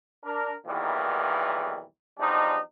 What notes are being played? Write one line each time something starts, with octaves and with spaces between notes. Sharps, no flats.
D4 A#4
B1 E2 A#2 D#3 E3 G3
E2 F3 G3 D4 D#4